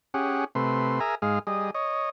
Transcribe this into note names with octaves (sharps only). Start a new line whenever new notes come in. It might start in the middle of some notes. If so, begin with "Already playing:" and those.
C#4 G4 G#4 F#5
C3 A3 B4 C6
G#4 A#4 E5 G#5 A#5
G#2 G#3 G#4 F5
G3 G#4 D#5
C#5 D#5